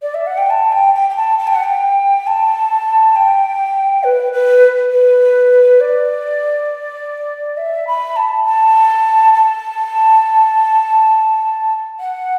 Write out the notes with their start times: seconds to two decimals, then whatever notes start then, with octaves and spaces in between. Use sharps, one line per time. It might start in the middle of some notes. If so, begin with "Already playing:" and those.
0.02 D5
0.14 E5
0.27 F#5
0.38 G5
0.50 A5
0.72 G5
0.95 G5
1.10 G5
1.16 A5
1.39 A5
1.47 G5
1.55 F#5
1.64 G5
2.27 A5
3.16 G5
4.04 B4
4.33 B4
4.92 B4
5.81 D5
7.57 E5
7.87 B5
8.16 A5
8.45 A5
9.33 A5
12.00 F#5